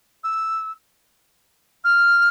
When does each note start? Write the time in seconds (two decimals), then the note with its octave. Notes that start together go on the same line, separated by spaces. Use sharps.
0.24 E6
1.84 F6